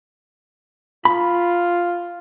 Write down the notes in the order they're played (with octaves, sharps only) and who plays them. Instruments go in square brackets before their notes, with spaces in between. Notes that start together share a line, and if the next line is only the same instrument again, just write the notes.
[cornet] F4 [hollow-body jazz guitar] B5